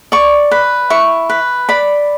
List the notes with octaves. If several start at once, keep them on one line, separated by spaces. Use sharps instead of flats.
D5 C#6
B4
E4 C#6
B4
D5 B5